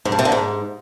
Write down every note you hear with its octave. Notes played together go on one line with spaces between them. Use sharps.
G#2
G2
C3
D3
G#2